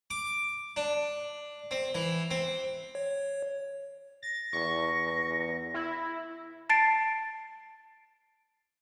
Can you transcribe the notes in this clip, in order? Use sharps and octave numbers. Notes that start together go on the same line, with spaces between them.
D6
D4
C4
E3
C4
C#5
A6 A#6
E2 C#6
E4
A5 A6 C7 D7